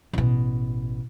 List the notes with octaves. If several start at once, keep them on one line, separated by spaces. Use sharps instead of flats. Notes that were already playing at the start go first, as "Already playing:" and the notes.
A1 B2